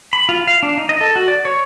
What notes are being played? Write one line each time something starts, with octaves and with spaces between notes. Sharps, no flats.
B5
F4
F5
D4
D#4
D#5
A4
F#4
D5
C#5